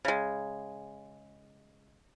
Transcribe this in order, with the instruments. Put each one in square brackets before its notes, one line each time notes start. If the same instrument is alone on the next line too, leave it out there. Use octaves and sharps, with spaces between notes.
[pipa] C#3 G#3